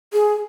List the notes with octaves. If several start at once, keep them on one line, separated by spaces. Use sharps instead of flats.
G#4